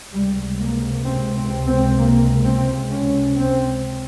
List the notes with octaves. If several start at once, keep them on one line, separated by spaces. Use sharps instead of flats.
C#2 C3 G3
A#3
C4
C4
C4
A#3
C4
C#4
C4